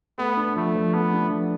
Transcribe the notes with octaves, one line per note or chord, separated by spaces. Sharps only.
A3 B3
D4
F3 A3
F3
A3 B3
D4
F3